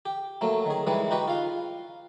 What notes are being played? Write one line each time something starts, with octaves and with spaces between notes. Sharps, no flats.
G4
F#3 A3 A#3
D#3 G#4
D#3 E3 G3 G#3 B4
D#4 F#4 G4 B4
F4 F5